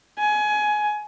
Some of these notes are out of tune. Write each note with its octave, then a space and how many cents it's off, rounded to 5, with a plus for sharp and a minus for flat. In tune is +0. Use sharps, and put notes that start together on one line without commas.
G#5 +20